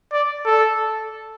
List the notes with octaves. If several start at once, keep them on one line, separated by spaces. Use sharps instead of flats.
D5
A4